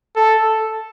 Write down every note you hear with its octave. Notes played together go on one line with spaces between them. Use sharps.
A4